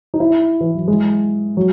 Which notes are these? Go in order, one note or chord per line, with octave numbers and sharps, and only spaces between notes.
D#4
E4
E3
F#3
G#3
F#3